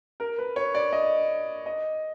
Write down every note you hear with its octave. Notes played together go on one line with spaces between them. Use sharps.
A#4
B4
C#5
D5
D#5
D#5